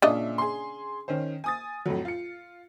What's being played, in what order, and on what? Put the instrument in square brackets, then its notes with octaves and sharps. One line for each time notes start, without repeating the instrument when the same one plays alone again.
[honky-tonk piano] A#2 E5 [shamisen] C#3 D4 D#5
[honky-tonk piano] G#4 C6
D#3 C#4 C5
G#5 D#6 A6
F2 A2 F#3
F4 C#7